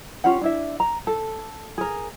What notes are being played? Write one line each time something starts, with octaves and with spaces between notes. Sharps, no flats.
C#4 F4 G4 F#5
D4 E4 E5
A#5
A4
G#4 A#4